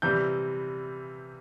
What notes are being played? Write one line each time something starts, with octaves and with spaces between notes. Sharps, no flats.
C3 E3 G3 G6